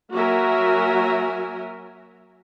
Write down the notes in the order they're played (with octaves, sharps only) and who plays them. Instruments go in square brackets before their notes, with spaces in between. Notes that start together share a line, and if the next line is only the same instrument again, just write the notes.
[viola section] F#3 A#3 F#4 A#4 E5 G#5